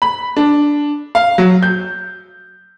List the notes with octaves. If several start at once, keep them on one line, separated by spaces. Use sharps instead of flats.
B5
D4
F5
F#3
G6